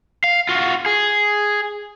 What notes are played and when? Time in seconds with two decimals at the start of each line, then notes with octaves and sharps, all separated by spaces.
0.24 F5
0.49 F4 F#4
0.86 G#4